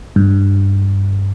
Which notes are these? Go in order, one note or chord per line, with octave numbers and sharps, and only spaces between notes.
G2